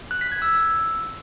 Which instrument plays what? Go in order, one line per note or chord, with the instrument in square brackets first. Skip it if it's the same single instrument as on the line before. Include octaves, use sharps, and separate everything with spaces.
[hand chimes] F#6
B6
G#6
E6